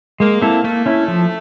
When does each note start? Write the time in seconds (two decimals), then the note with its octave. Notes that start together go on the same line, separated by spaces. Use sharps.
0.20 G#3 A#3
0.41 C4 E4 A4
0.64 A3 A#3
0.86 C#4 E4
1.08 F3